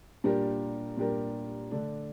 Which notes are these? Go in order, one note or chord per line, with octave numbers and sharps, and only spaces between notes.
A#2 G3 D4 G4 A#4
A#2 G3 D4 G4 A#4
D3 A3 D4